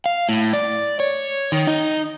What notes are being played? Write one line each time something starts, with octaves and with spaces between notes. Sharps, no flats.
F5
A2
D5
C#5
D#3
D#4